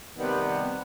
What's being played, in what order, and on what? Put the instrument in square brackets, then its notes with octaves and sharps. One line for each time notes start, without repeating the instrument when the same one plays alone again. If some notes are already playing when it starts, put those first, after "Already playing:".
[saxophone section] C3 D#3 G3 B3